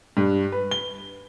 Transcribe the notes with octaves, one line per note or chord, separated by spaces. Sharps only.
G2
B4
G7